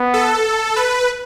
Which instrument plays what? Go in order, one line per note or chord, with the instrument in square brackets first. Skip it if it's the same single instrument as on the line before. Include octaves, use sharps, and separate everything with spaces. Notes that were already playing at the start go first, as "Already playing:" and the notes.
Already playing: [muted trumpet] B3
[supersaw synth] A4
B4